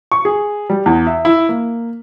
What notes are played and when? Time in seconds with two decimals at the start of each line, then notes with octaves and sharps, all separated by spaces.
0.12 C#6
0.25 G#4
0.70 G3
0.86 E2
1.07 E5
1.25 E4
1.49 A#3